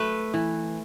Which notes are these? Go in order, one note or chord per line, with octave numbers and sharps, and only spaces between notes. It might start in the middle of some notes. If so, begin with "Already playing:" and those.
Already playing: A3 B4
E3